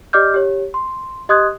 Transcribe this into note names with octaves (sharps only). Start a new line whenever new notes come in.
G4 D5 D#5 D6 F6 G6
G4 C#5
C6
G4 D#5 C6 D#6 F#6 G#6